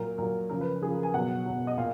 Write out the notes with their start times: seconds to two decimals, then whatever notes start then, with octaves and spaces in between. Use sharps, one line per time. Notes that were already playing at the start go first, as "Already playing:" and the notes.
Already playing: A#2 F#3 A#4
0.18 A#2 F#3 A#4
0.49 C#3 F3 A#4
0.61 B4
0.82 C#3 G#4
0.85 F3
0.92 A#4
1.03 G#5
1.14 B2 F#3 F#5
1.46 B2 F#3
1.67 D#5
1.78 A#2 F5